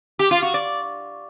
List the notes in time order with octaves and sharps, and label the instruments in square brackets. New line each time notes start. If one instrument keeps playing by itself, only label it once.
[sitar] G4
F4
F#4
D5